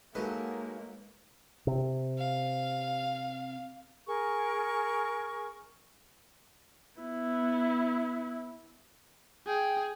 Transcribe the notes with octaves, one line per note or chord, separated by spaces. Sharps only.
F#3 G#3 A#3 D#4 F#4 G#4 A4 B4
C3
F5
G#4 A#4 C#6
B3 E4
G#4 G5